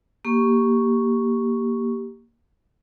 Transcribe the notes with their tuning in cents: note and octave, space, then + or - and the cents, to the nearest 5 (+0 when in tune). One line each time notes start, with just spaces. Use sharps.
A#3 +5 G4 +0 C#6 +0